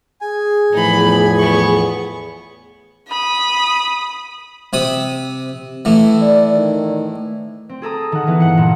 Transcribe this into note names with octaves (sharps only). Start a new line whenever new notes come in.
G#4 G#5
E2 A2 F3 D#4 B5
B3 C#6
B5 D#6
C3 B5 D#6
A2 E3
D5
D#3
C4
G#4 A4 A#5 D#6
D#3 F#5
E3 B3
G2 F#5 C#7
G2 A#2 D#3